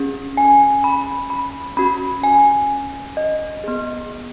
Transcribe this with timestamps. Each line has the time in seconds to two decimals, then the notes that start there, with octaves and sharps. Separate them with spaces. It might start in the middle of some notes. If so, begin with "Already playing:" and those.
Already playing: C#4 G#4
0.37 G#5
0.84 B5
1.30 B5
1.77 C#4 F#4 B5
2.23 G#5
3.17 D#5
3.64 B3 G#4